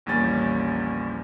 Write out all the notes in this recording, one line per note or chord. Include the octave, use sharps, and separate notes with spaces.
A#1 E2 G3 A#3 C#4 A6